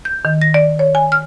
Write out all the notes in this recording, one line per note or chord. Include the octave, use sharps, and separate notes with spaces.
G6
D#3
A#6
D5
C#5
G#5
F6